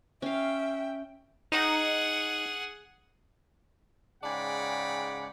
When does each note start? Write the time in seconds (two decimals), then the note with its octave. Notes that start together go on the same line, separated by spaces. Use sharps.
0.22 C#4 E5 F5 G5
1.52 D#4 G#4 F#5
4.23 G#2 C#3 D5 F#5 G5 B5